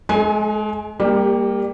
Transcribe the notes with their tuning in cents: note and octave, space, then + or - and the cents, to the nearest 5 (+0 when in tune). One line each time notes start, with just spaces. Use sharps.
G#3 +30 A4 -35 G#5 +0
G3 +30 A#3 +0 G4 +0